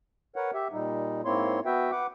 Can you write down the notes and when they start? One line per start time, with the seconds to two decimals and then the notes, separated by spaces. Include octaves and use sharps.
0.36 A#4 B4 C#5 F#5
0.54 G4 E5
0.73 A#2 G3 D#4
1.25 G#2 A#3 C4 E4 C#5 C6
1.66 B3 F#4 B4 E5 G5
1.92 B4 F#5 D6